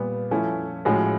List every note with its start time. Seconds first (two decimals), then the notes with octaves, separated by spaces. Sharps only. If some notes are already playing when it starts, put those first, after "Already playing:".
Already playing: A#2 G3 B3
0.31 F3 A3 C#4 E4
0.85 A2 F3 G#3 C#4 F#4